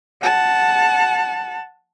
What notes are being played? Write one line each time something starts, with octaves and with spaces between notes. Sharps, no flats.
F#5 A5